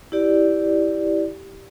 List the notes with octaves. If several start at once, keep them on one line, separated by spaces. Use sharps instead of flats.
E4 G4 D5